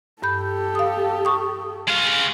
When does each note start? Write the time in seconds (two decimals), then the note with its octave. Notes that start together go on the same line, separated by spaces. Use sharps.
0.22 G2 G4 A4 B5 G6
0.75 F5 D#6
1.25 C#6 D#6
1.88 G#3 F5